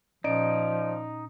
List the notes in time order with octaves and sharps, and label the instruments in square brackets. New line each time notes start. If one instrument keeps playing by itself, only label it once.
[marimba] A#2 C#4 [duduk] F3 [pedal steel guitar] D#4 [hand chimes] D5 D#5 D7